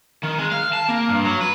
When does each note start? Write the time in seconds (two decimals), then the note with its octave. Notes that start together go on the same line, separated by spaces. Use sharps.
0.23 D#3
0.38 G#3
0.52 F5
0.73 A5
0.88 A#3
1.09 G2
1.24 F#3
1.41 B4